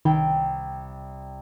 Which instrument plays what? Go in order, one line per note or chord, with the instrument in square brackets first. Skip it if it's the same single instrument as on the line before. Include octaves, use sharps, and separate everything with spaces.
[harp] C2 G5 [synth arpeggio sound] D#3